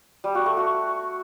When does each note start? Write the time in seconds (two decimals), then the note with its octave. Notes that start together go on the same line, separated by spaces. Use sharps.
0.24 G3
0.35 F#4
0.46 A3
0.57 F#4